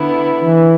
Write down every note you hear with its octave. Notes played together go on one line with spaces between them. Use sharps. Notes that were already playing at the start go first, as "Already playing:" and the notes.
Already playing: D3 B3 E4
E3